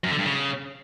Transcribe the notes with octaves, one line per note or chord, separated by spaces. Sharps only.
F#2
D3
G2
C#3